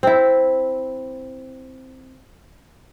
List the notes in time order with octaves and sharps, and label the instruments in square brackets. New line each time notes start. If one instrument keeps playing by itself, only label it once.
[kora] C4 E4